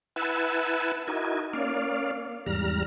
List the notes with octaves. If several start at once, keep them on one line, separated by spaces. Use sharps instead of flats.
E4 B4 F#5 G#5 A5 E6
D#4 E4 F#4 A#4 G#5
A#3 C#4 D5 F5
E2 G#2 G3 A#5 F6